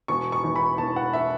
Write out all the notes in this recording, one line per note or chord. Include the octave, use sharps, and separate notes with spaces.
E1 C#6
C#6
E2 E3
B5
E1 A5
F#5
E3 E5